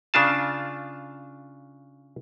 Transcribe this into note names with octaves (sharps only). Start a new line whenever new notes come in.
C#3 D4 F4 A5